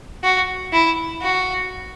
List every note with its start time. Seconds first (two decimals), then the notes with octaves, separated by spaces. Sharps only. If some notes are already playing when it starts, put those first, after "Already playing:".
0.24 F#4
0.73 E4
1.22 F#4